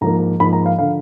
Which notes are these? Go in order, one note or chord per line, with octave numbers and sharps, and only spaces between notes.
G#2 F3 A#3 A#5
G#2 F3 A#3 B5
A#5
F5
D3 F3 F5